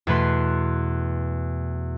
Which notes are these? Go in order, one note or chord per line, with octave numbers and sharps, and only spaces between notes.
E2 B2 A3 B4 C6 C7